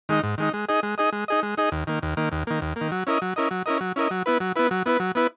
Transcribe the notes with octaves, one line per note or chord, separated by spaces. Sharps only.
D#3 G#3 D#4
G#2
D#3 G#3 D#4
G#3
D#4 G#4 D#5
G#3
D#4 G#4 D#5
G#3
D#4 G#4 D#5
G#3
D#4 G#4 D#5
D#2
D#3 A#3
D#2
D#3 A#3
D#2
D#3 A#3
D#2
D#3 A#3
F#3
C#4 E4 A#4 D#5
F#3
C#4 E4 A#4 D#5
F#3
C#4 E4 A#4 D#5
F#3
C#4 E4 A#4 D#5
F#3
B3 E4 B4
F#3
B3 E4 B4
F#3
B3 E4 B4
F#3
B3 E4 B4